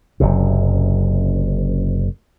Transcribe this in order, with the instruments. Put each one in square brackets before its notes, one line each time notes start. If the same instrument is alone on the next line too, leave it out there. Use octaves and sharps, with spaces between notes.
[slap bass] F#1 F#2 C3